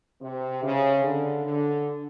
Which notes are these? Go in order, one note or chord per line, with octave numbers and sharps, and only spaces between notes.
C3
C#3
D3
D3